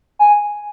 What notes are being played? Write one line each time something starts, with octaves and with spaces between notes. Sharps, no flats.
G#5